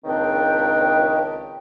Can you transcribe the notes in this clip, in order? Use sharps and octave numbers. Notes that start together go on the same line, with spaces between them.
C#2 A#2 D#3 C4 D4 G5